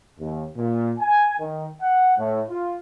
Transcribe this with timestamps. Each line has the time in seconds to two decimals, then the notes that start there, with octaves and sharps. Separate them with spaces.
0.19 D#2
0.56 A#2
0.99 G#5
1.38 D#3
1.80 F#5
2.17 A2
2.48 F4